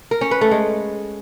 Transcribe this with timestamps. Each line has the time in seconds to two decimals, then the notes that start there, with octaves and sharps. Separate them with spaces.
0.11 A#4
0.21 C#4
0.31 B4
0.41 A3
0.51 G#3